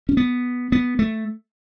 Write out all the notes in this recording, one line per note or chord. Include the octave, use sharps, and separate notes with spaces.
C#4
B3
B3
A3